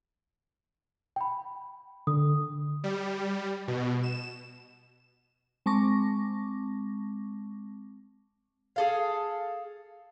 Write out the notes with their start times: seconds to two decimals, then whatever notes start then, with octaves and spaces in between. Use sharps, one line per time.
1.16 G5 B5
2.07 D3 D#6
2.84 G3
3.68 B2
4.03 E7
5.66 G#3 C4 A5 C#6 D6 A#6
8.76 G#4 A4 F5